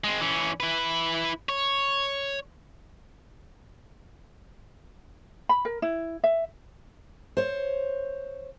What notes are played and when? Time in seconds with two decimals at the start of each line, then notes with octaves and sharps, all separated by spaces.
0.04 G#3 C4
0.21 E3 C#4
0.60 E4 B4
1.49 C#5
5.49 B5
5.65 A#4
5.82 E4
6.24 E5
7.37 C5 C#5